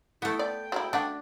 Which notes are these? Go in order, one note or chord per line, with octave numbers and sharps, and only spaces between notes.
A3 B3 E4
D5 G5
F#3 G#3 E4
A3 D4 F#4